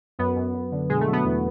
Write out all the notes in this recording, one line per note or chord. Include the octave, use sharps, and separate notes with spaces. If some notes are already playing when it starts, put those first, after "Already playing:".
F#2 B3
F#2
F#2
D3
B2 G#3
A3
F#3
B3
E2